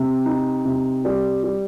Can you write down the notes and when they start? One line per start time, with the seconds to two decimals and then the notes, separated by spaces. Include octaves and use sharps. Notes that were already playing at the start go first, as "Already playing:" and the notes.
Already playing: C3
0.26 D#4
0.65 C3
1.05 G3
1.44 G3